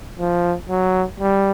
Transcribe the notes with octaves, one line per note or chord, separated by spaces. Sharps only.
F3
F#3
G3